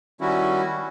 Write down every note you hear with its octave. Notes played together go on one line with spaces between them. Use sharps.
D#3 G3 C#4 E4 F#4